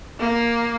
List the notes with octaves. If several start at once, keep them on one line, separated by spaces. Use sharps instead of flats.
A#3